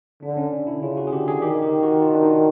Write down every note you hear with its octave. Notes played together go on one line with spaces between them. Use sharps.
D3 D4
C#4
D4
E4
C#3 F4
F#4
G#4
D3 G4
G#4
D#3 G4
G4
F#4
F4
D4
D#4